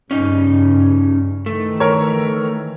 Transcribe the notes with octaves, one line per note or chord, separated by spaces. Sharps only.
G2 C#3 C#4 D#4
D#3 E3 A3
A#4 C#5